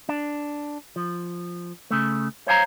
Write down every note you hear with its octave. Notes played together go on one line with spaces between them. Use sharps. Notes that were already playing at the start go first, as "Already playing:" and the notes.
D4
F3
C#3 A3
C5 C#5 F5 G#5 A#5